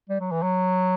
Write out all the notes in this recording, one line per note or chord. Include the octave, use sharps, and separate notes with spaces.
G3
F#3
E3
F#3